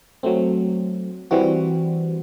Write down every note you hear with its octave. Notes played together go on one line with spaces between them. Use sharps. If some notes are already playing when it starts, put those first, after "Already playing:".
F#3 A3 C4
E3 G3 C4 F#4